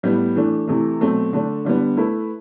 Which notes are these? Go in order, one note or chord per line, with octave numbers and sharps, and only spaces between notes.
A2 G3 B3
E3 A3 D4
C3 E3 A3
B2 F#3 A3 C4
D3 A3 D4
D3 G3 B3
A3 E4 B4